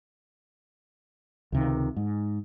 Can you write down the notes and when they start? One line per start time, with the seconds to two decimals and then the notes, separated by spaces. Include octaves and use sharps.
1.52 C#2 C3 D#3
1.96 G#2